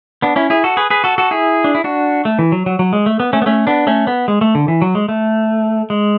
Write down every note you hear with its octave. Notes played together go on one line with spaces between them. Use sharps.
B3 D4
C#4 E4
E4 G#4
F#4 A4
G#4 B4
G#4 B4
F#4 A4
F#4 A4
E4 G#4
D4
E4
D4 F#4
A3
E3
F#3
F#3
F#3
G#3
A3
B3
A3 C#4
B3
A3 C#4
B3 D4
A3 C#4
B3
G#3
A3
D3
E3
F#3
G#3
A3
G#3